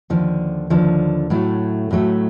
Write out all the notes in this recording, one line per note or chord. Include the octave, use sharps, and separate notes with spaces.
D#2 D3 F3
D#2 D3 F3
A2 F#3 A3
A2 F#3 A3